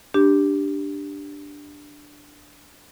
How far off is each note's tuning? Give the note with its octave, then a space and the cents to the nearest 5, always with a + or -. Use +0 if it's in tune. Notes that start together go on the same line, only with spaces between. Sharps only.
D4 +0 G4 +0